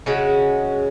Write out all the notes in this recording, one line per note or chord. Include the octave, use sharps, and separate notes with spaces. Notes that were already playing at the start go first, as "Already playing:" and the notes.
C#3 G#3 C#4 F#4